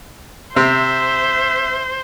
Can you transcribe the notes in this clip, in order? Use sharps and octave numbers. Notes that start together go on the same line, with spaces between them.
C3 C4 C5 E5